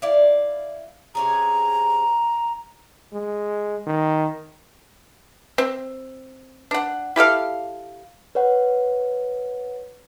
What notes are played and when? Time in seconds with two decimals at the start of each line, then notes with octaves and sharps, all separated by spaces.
0.02 E4 D5 F5
1.15 C3 C#4 G#4 A#5
3.13 G#3
3.87 D#3
5.58 C4
6.71 D4 F#5
7.16 E4 G4 A4 F5
8.35 B4 C#5 F#5